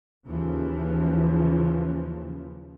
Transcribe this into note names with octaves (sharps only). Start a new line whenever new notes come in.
D#2 C#3 E3 F3